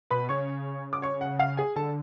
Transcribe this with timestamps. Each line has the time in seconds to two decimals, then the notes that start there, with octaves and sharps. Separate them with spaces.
0.10 B2 B4 B5
0.29 C#3 C#5 C#6
0.93 D6
1.02 C#5 C#6
1.21 F#5
1.39 F5
1.57 G#4 G#5
1.76 D3 A4 A5